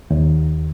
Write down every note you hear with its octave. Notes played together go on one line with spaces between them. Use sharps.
D#2